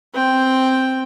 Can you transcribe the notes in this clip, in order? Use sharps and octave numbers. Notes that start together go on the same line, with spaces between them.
C4 G5